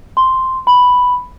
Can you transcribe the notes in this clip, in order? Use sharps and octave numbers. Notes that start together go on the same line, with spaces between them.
C6
B5